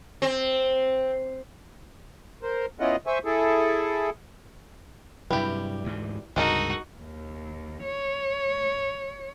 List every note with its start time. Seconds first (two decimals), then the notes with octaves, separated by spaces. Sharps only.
0.22 C4
2.43 A#4 C5
2.80 B3 C#4 E4 F4 D#5 F#5
3.07 C5 E5 G#5 C#6
3.25 E4 G#4 A4
5.31 G2 C3 F#3 G3 E4 G4 B4
5.84 D2 G#2 E3
6.36 C#2 G2 C3 G#3 D#4 F#4 A4 A#4
6.98 D#2
7.83 C#5